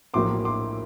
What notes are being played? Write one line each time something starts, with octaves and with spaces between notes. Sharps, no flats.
A#1 A2 F#3 A#3 C6 D6
C6 D6